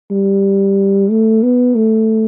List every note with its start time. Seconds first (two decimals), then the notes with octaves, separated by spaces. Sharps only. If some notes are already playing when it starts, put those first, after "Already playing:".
0.11 G3
1.10 A3
1.43 B3
1.75 A3